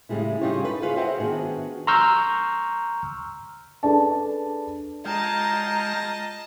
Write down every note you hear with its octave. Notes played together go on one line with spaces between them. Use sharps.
A2 C#3 G3 G#3 E4
C#3 G3 D#4 F4 G4 C#5
A4 B4
F4 G#4 B4 C#5 F5
F#4 C5 D#5 E5 F#5 G5
D#3 B3 D4 F#4 G#4
A#5 C6 C#6 E6 F6 G6
D4 G#4 A4 B4 D5 A5
G#3 F4 D#5 G5 A5 A#5